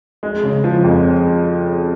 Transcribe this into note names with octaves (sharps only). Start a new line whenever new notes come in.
G#3
C#3
F3
F2